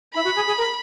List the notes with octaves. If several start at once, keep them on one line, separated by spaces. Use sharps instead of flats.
E4 B5
F#4
G#4
G#4
A#4